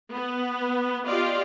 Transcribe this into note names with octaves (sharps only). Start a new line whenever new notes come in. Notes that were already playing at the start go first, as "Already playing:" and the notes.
B3
F4 G4 D5 D#5 F5